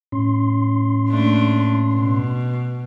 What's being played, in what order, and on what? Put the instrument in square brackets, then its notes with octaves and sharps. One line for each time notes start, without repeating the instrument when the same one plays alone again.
[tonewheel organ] A2 C#4 C6
[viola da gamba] A3 A#3 D4
B2